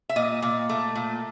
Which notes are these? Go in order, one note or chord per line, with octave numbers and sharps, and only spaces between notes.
E5
A#2 D#5
A#2
A3
A#2